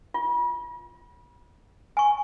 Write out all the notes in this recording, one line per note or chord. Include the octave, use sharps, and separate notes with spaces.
F4
G#5 C#6